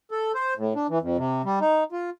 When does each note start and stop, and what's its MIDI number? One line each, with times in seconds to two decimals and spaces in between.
0.11 0.32 69
0.35 0.54 72
0.57 0.73 45
0.75 0.87 62
0.90 0.99 52
1.02 1.17 41
1.18 1.42 48
1.45 1.59 55
1.61 1.84 63
1.92 2.10 65